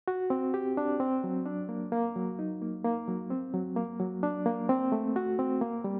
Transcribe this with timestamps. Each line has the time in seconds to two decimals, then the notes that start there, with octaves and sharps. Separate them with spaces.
0.08 F#4
0.30 C4
0.54 G4
0.77 D4
1.00 C4
1.24 F#3
1.46 D4
1.69 A#3
1.92 A#3
2.16 F#3
2.39 D#4
2.62 A#3
2.85 A#3
3.08 F#3
3.30 C4
3.54 F#3
3.76 A#3
4.00 F#3
4.23 D4
4.46 A#3
4.69 C4
4.92 A3
5.16 F#4
5.39 C4
5.61 A#3
5.84 G3